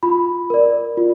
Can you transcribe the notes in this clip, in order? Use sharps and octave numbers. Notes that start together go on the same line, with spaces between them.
F4 B5
A#4 D5
F4